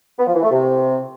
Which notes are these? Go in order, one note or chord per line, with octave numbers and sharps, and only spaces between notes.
B3
F3
E3
A3
C3